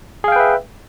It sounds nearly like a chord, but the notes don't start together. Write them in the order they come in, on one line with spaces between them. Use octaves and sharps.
G#4 F5 G5 B4 E5